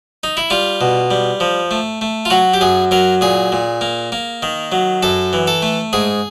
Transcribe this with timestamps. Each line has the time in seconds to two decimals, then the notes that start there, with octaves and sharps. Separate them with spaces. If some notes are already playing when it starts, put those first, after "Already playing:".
0.23 D#4
0.37 E4
0.50 G3 F4
0.81 B2
1.11 G3
1.40 F3
1.71 A3
2.01 A3
2.25 F4
2.30 F#3 F#4
2.54 G4
2.61 F#2 G#4
2.91 F#3 A#4
3.21 A#2 G#4
3.52 A#2
3.81 A#3
4.12 A#3
4.43 D#3
4.72 F#3
5.03 F#2 A4
5.33 E3
5.47 A4
5.62 A3
5.93 G#2 G#4